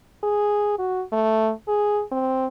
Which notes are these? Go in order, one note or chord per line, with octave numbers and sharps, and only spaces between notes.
G#4
F#4
A3
G#4
C4